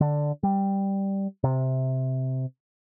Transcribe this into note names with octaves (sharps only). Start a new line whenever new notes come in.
D3
G3
C3